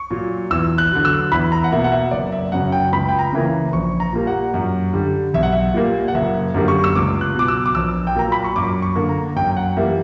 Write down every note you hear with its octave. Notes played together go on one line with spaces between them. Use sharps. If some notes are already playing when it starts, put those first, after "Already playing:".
Already playing: C#6
A#2 F#3
E2 E6
F#6
D3 F#3
E6
E2 B5
A#5
F#5
B2 A#3 E5
F#5
E5
F#1 D5
E5
F#2 C#3 F#3 F#5
G5
C#2 B5
G5
A#5
C#3 E3 A#3
A#1 C#6
A#5
A#2 G3 A#3
F#5
F#2
D3 G3
B1 E5
F#5
E5
A#2 G3 A#3
F#5
F#1 E5
F#2 D3 G3 A#3
C#6
E6
C#2 D6
F#6
B2 F#3 D6
E6
D6
A#1 E6
G5
A#2 F#3 A#3 A#5
B5
C#6
F#2 D6
C#6
D3 A#3
A#5
F#2 G5
G5
F#5
E3 G3 A#3 E5